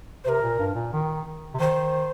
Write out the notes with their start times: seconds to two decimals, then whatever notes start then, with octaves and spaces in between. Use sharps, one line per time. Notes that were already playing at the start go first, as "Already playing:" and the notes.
0.24 C3 A#4 C5
0.41 A#2
0.59 G2
0.75 A#2
0.93 D#3
1.54 C3
1.60 D#3 C5